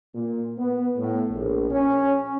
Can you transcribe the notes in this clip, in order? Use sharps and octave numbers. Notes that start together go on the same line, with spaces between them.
A#2
B3
A2
A#1
C#4